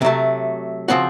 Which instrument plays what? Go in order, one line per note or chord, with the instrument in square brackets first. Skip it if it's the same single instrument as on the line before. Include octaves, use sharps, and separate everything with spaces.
[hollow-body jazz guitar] C3 F#3 A3
C#3 F3 C4 F#4